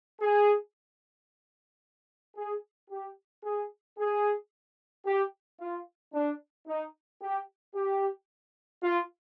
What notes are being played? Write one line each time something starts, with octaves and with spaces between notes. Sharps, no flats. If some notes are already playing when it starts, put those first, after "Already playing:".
G#4
G#4
G4
G#4
G#4
G4
F4
D4
D#4
G4
G4
F4